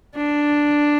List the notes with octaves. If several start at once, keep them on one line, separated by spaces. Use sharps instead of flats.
D4